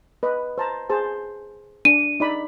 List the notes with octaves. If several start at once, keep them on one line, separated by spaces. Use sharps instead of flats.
B4 D#5
C5 A5 A#5
G#4 C5 A5
D4 D#7
D#4 D5 B5